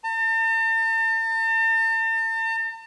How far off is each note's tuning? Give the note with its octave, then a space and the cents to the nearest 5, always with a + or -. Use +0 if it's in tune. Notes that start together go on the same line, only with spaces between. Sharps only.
A5 +45